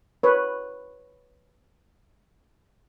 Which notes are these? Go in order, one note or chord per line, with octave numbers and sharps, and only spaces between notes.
B4 C#5